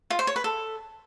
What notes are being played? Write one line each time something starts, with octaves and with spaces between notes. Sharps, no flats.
F4
C5
C#5
B4
A4